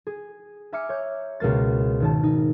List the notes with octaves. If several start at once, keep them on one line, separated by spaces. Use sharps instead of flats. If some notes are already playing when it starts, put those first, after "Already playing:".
G#4
E5 G#5 A#5 D6 F6 C#7
C#5 G6
C#2 B2 A#3 A6
G#1 D#3 A5
D#4